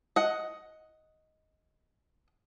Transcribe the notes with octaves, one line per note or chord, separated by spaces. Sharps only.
D#5 F#5